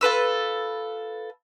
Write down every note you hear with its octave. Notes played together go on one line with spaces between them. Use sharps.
F4 A4 B4 E6